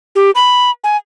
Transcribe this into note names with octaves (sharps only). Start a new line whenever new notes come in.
G4
B5
G#5